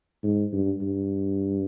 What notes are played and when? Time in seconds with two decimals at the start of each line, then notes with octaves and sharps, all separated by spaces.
0.24 G#2
0.53 G2
0.82 G2